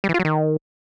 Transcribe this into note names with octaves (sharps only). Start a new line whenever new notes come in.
G3
E3
F4
F#3
D#3